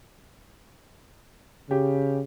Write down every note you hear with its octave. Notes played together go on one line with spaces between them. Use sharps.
C#3 G4